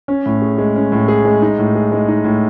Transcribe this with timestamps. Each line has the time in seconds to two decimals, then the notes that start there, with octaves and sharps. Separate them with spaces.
0.08 C#4
0.26 A2
0.42 G#4
0.58 G#3
0.76 C#4
0.92 A2
1.08 G#4
1.25 G#3
1.42 D#4
1.59 A2
1.75 G#4
1.92 G#3
2.08 D#4
2.25 A2